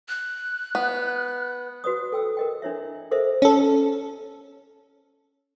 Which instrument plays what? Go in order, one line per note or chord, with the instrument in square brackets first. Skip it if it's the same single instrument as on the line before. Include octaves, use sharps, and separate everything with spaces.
[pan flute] F#6
[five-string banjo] B3
[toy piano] F#4 B4 D5 D#6
A4 G5 E6
A#4 D#5 G5
D4 E4 C#5 E5
A4 A#4 C5 D#5 E5
[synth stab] C#4 A4